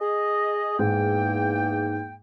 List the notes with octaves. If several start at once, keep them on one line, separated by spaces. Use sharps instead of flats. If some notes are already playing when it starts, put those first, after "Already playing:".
G#4 D#5
E2 G#2 A#3 G5